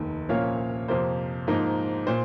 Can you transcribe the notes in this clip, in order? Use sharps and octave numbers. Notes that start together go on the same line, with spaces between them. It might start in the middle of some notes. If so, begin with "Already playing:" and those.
Already playing: F1 D#2 D#3
C2 A#2 F3 A#3 C#4 C#5 F5
F2 C3 F3 A#3 C5
G#2 F3 A#3 D#4
A#2 C5